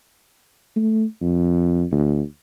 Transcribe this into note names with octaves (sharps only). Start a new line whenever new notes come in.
A3
F2
D2